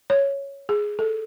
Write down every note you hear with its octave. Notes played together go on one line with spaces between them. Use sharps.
C#5
G#4
A4